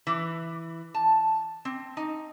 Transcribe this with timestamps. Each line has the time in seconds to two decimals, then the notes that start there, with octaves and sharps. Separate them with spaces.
0.07 E3
0.94 A5
1.65 C4
1.97 D#4